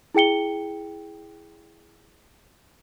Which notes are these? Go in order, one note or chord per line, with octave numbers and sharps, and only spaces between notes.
E4 G#4 G5 C#7 G7